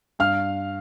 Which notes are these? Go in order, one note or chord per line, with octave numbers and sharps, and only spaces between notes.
G2 F5 F6